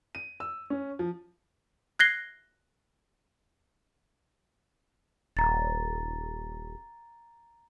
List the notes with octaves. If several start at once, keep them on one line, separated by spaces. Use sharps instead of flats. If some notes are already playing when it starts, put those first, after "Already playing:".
D#7
E6
C#4
F3
F#6 G#6 A#6 C7 G7
D#1 A#5 A6